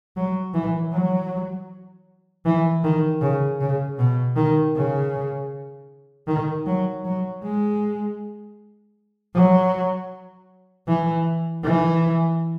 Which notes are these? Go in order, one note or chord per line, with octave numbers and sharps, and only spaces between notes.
F#3
E3
F#3
E3
D#3
C#3
C#3
B2
D#3
C#3
D#3
F#3
F#3
G#3
F#3
E3
E3